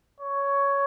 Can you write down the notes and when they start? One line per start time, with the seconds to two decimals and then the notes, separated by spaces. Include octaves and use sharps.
0.20 C#5